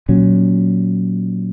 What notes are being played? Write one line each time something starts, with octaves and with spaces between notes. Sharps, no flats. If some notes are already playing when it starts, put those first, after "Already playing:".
A#2 F#3 C#4